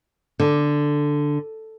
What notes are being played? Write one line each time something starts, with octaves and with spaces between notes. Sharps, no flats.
D3